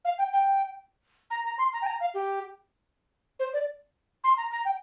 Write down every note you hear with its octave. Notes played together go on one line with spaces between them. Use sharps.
F5
G5
G5
A#5
A#5
C6
A#5
G5
A#5
F5
G4
C5
D5
C6
A#5
A#5
G5